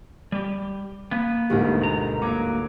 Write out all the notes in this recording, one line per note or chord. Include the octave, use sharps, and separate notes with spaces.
G3 G4
A#3 B3
G1 D2 G#2 G3 A#4
B2 A#5
F#3 A#3 D#4 D6